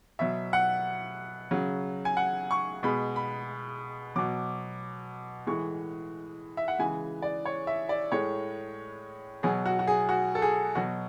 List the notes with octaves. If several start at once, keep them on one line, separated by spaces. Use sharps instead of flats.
B2 F#3 E5
F#5
C#3 F#3
G#5
F#5
C#6
B2 G#3 B5
B5
B2 F#3 D6
A2 E3 G#3 C#6
E5
F#5
C#3 E3 G#3 G#5
D5
C#5
E5
D5
A2 G#3 C#5
B2 F#3 G#4
F#4
F#4
G#4
F#4
A4
G#4
B2 F#3 F#4